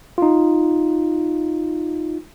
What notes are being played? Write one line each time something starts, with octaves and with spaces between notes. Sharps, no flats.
D#4 F4